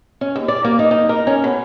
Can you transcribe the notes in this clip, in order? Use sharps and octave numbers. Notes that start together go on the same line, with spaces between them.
C#4
D#2
D5
A#3
D#4
D#4
A#4
C#4
B2